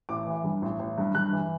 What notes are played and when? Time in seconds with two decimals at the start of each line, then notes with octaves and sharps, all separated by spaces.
0.09 A1 D6
0.27 E3
0.44 G2
0.62 A1
0.79 A1
0.98 G2
1.15 G2 F#6
1.32 E3